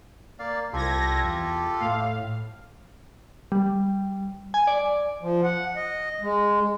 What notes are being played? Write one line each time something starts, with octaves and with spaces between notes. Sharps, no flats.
A#3 D5 F5
C2 F4 G4 A4 G#6 A#6
E2
A2 F5
G3
G#5
D5
F3
F#5
D#5
G#3